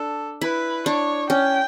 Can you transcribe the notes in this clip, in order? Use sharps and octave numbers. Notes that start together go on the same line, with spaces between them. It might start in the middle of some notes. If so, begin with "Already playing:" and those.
Already playing: D4 A4
E4 B4
D4 C#5
C#4 G5